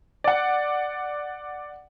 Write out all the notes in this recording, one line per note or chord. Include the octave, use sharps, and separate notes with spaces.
D5 F#5